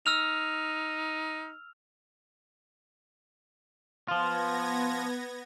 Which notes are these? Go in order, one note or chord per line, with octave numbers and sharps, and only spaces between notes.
D#4 E6 F6 F7
F3 B3 F4 G#6 A#6